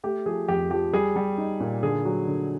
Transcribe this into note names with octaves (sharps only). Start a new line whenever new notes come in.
A3 G4
F3 G#4
F2 G4
F3 G4
G3 G#4
G3
D#4
A#2
D3 G#4
F#3
D3